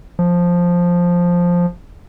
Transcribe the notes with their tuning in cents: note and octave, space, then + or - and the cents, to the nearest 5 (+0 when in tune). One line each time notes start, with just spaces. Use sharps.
F3 +5